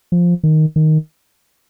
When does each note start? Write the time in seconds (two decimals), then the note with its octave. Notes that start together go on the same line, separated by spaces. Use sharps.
0.12 F3
0.43 D#3
0.76 D#3